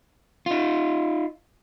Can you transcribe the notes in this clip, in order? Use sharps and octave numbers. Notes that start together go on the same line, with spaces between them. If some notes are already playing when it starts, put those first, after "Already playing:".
D#4 F4